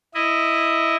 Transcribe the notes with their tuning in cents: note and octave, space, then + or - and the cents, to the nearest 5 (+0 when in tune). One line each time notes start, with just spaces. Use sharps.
E4 +0 D#5 +0